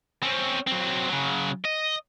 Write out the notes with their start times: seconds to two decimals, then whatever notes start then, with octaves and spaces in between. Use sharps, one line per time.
0.23 C4 C#4
0.67 F#3 C4
1.08 C#3 F#3
1.64 D#5